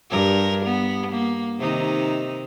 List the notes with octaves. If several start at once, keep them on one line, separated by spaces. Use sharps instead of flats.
G2 A#4
B3
A#3
C3 D#3 D#4